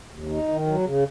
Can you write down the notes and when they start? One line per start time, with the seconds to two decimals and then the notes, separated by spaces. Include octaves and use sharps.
0.11 D#2
0.29 D#4
0.48 D#3
0.66 F#3
0.85 C#3